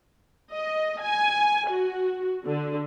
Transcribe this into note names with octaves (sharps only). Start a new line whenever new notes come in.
D#5
G#5
F#4
D3